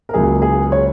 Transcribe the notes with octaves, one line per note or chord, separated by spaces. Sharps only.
A#4
C#2 C#3 F#3 A#3 E4 G#4
G#4
C#5